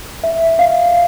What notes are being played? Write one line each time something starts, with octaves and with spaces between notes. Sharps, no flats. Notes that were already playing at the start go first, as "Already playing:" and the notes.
E5
F5